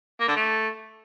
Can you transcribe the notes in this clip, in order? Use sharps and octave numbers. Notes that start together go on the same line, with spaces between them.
A#3
D3
A3